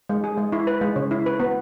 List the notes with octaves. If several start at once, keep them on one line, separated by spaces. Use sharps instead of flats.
G#3
G#4
G#3
E4
B4
G#3
C#3
E4
B4
B3